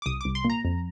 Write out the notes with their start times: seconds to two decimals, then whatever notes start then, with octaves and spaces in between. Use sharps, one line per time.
0.02 D6
0.06 C2 D#6
0.21 C2 D6
0.35 C6
0.45 A#2
0.50 A#5
0.65 F2